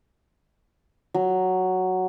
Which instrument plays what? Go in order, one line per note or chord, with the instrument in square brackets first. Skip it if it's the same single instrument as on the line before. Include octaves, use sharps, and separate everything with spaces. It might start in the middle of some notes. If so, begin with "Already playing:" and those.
[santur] F#3